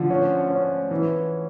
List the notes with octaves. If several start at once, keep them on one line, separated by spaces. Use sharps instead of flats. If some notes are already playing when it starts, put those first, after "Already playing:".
Already playing: D3 F3
C#4
C#4
E3